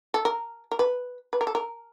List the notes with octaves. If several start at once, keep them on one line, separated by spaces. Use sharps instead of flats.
A4
A#4
A#4
B4
B4
A#4
A4
A#4